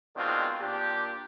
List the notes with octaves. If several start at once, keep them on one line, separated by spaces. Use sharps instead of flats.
B2 D#3 G#3 C4 D4 F4
A#2 D4 G4